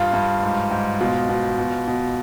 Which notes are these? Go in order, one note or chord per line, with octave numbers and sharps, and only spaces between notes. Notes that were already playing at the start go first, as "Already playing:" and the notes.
Already playing: G2 F4
G2
G#2
G#2
B2 F4
B2
B2
B2